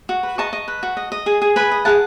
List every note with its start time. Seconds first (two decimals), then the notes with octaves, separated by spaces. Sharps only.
0.09 F#4
0.23 B4
0.38 D#5 A5 C#6
0.53 D#5
0.68 B4
0.83 F#4
0.97 D#5
1.12 D#5
1.26 G#4
1.42 G#4
1.56 B4 G#5 B5
1.71 D#5
1.85 G#4 F#5 A5